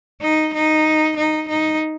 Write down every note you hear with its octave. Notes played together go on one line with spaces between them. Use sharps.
D#4
D#4
D#4
D#4